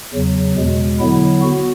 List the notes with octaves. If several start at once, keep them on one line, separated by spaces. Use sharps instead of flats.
E2 C#3 F#3
E2 B2 G#3
D3 F#3 B3 E4
B3 F#4